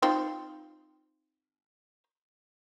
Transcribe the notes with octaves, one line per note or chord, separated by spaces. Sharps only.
C4 D#4 F4